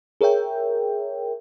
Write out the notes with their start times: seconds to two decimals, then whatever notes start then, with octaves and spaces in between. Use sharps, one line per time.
0.21 G#4 A#4 C#5 E5 G5